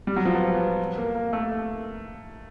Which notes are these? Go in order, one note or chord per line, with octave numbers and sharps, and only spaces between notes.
G3
F#3
F3
B3
A#3
A#3
A3